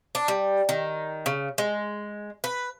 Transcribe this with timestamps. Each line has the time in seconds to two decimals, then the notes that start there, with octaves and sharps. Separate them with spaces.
0.15 D4
0.28 G3
0.69 D#3
1.26 C#3
1.58 G#3
2.44 B4